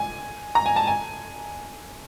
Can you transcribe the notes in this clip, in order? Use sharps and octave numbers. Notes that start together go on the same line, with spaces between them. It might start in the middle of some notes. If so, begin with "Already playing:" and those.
Already playing: G#5
A#5
G#5
A5
G#5